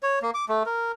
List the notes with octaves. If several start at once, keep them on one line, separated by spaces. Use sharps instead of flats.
C#5
A#3
D6
A3
A#4